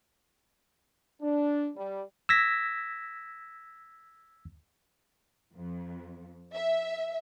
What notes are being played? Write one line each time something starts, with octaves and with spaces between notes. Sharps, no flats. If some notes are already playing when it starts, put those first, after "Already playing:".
D4
G3
E6 G#6 A#6 B6
F2
E5